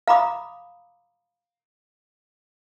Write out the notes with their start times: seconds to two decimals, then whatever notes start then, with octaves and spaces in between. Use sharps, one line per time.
0.08 F5 A#5 B5 D6 D#6